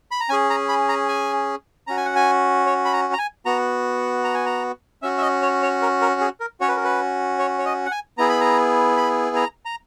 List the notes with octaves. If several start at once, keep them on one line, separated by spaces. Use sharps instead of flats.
B5
A#5
C#4 G#4 G#5
A#5
B5
A#5
G#5
C#4 F#4 A#5
G#5
F#5
G#5
C#5
B5
A#5
A#5
G#5
B3 F#4 A#5
A#5
G#5
A#5
C#4 F#4 E5
E5
D#5
C#5
C#5
A#4
A#4
G#4
A#4
C#4 F#4 C#5
B4
A#4
B4
C#5
C#5
D#5
F#5
G#5
B3 E4 G#4 A#5
B5
A#5
B5
A#5
A#5